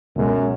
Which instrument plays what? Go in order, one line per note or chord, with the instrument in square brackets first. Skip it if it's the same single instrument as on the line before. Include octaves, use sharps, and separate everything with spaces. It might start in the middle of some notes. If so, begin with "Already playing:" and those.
[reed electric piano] C#2 B2 G#3 [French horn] F#2